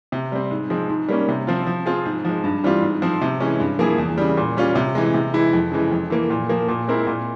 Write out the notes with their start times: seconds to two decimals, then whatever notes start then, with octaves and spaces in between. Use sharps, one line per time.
0.12 C3
0.32 G3 C4
0.51 G#2
0.70 F3 G#3 C4
0.89 G#2
1.08 G3 A#3 C#4
1.29 C3
1.47 F3 C4 F4
1.66 F3
1.86 C4 F4 G#4
2.05 G#2
2.25 F3 G#3
2.44 G2
2.64 E3 G3 C4 F4
2.82 G#2
3.02 F3 C4
3.21 C3
3.40 E3 G#3 C#4
3.60 G2
3.79 F3 A#3 E4 G#4
3.98 E2
4.18 C#3 G3
4.37 A#2
4.57 G3 C#4 F4
4.75 C3
4.95 E3 G#3
5.14 C3
5.33 E3 G#3 E4
5.53 F2
5.72 C#3 E3 G#3
5.91 F2
6.10 E3 A#3
6.30 A#2
6.49 F3 A#3
6.69 A#2
6.88 G#3 C4 E4 A#4
7.07 A#2